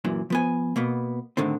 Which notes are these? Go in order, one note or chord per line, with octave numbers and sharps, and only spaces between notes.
F#2 A#2 E3
F3 B3 G#5
B2 A#3 B3
A2 D3 D#3 C4